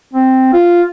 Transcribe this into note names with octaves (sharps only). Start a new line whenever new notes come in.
C4
F4